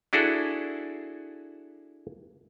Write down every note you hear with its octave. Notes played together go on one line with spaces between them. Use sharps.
D4 E4 F#4 G#4 A4